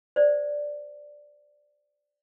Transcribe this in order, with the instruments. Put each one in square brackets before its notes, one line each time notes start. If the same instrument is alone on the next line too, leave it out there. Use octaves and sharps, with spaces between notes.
[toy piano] C5 D5